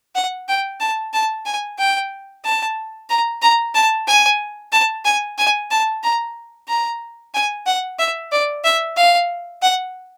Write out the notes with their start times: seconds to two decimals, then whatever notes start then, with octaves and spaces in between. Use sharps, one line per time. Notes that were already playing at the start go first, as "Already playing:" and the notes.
0.15 F#5
0.48 G5
0.80 A5
1.13 A5
1.46 G#5
1.78 G5
2.44 A5
3.10 A#5
3.42 A#5
3.75 A5
4.07 G#5
4.72 A5
5.05 G#5
5.38 G#5
5.71 A5
6.03 A#5
6.68 A#5
7.34 G#5
7.66 F#5
7.99 E5
8.32 D5
8.64 E5
8.97 F5
9.62 F#5